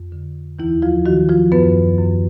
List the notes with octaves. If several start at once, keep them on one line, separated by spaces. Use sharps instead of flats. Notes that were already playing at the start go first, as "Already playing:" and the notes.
Already playing: F2
D3
D#2 E3 E4
F3 F4
D#3 F#3 F#4
F3 F4
F#2 B3 B4
F#2